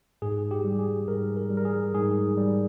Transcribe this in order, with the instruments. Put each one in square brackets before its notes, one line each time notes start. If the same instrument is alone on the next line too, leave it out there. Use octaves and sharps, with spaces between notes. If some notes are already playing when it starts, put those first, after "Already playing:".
[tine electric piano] G#2 G#4
G4
G3
G#4
G#2 A#4
A#4
G3
A#4
G#4
G#2 G#4
G3